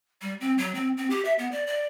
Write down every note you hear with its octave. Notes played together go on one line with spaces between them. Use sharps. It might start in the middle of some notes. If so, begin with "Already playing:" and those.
G3
C4
F#3
C4
C4
G4
E5
B3
D5
D5